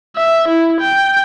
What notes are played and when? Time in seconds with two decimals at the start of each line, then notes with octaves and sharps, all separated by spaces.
0.16 E5
0.48 E4
0.81 G5